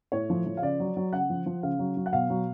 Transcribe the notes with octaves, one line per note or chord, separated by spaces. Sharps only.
A2 C#5
F3
F3
F5
C#3 D5
F#3
F#3
C#3 F#5
F3
F3
C#3 F5
F#3
F#3
F#5
B2 F5
F#3